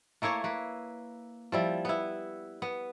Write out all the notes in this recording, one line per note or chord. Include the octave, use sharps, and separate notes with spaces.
A3 A#3 E4 C#5
A#3 B4
F3 G3 E4
B3 E4
B3